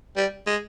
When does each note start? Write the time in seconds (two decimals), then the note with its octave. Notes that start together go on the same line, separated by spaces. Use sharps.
0.16 G3
0.47 G#3